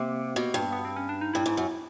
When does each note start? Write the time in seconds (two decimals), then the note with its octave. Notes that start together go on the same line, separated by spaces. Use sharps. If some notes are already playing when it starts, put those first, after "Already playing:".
Already playing: C3 A#3
0.36 B2
0.54 G2
0.73 B3
0.85 C4
0.96 C#4
1.09 D4
1.21 D#4
1.33 G2 E4
1.46 G#2
1.57 F#2